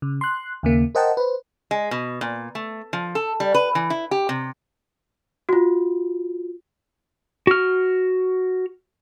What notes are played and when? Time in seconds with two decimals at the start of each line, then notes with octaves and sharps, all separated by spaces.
0.02 C#3
0.21 C6 F#6
0.63 D#2 C#3 A#3
0.95 A#4 C5 D#5 F#5 G5 A5
1.17 B4 C5
1.71 G#3
1.91 B2
2.21 A#2
2.55 A3
2.93 F3
3.15 A4
3.40 G3
3.54 B4
3.75 E3
3.90 E4
4.11 G4
4.29 C3
5.49 F4 F#4
7.47 F#4 F6